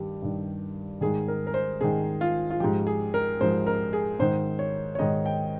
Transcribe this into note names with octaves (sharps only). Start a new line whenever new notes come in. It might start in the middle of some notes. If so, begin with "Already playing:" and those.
Already playing: G2 D#3 G4
G2 D#3
G#2 D#3 G#4
A#4
A#4
C5
G#2 D#3 G#4
F4
F4
G#2 F3 G4
G#4
A#4
G#2 F3 C5
A#4
G#4
G#2 D#3 C5
C#5
C#5
G#2 D#3 D#5
G5